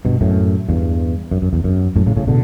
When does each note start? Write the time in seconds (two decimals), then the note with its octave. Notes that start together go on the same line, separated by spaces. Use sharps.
0.05 G2 B2
0.21 F#2 A2
0.69 E2 G2
1.31 F#2
1.42 F#2
1.53 E2
1.64 F#2
1.96 F#2 A2
2.06 A2 C#3
2.17 A2 C#3
2.28 B2 D3